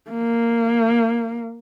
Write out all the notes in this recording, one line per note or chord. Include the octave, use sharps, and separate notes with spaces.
A#3